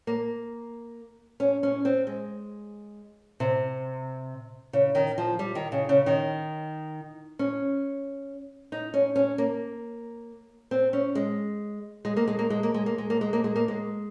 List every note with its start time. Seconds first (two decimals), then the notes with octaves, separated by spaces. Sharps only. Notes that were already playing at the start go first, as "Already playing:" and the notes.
0.07 A#3
1.40 C#4
1.63 C#4
1.85 C4
2.07 G#3
3.40 C3
4.73 C#3
4.95 D#3
5.18 F3
5.39 G3
5.55 D#3
5.72 C#3
5.89 C#3
6.06 D#3
7.39 C#4
8.72 D#4
8.94 C#4
9.16 C#4
9.38 A#3
10.71 C4
10.93 C#4
11.15 G#3
12.05 G#3
12.17 A#3
12.28 G#3
12.39 A#3
12.50 G#3
12.63 A#3
12.74 G#3
12.86 A#3
12.98 G#3
13.10 A#3
13.21 G#3
13.33 A#3
13.44 G#3
13.56 A#3
13.68 G#3